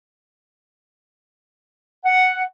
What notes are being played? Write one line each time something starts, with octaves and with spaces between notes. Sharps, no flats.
F#5